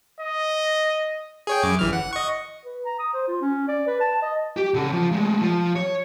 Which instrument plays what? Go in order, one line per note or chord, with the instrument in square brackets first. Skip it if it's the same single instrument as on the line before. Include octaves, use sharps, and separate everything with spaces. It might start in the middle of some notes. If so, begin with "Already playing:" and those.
[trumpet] D#5
[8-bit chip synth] G#4 C#5 G5
F#2 G#4 D6
G1 E3 F6
F#5
D#5 C#6
[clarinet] B4
A#5
D#6
C5
F4
C#4
D5
B4
A5
D#5
[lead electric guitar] G4
C#3 A4
F3
G#3 A3
F3
C#5